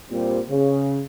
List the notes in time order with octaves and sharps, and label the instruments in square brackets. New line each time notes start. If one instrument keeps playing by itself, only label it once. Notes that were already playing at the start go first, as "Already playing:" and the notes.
[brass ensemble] A#2 G3 C4
C#3